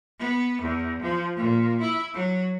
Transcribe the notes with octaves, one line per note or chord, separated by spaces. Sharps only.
B3
E2
F3
A#2
E4
F#3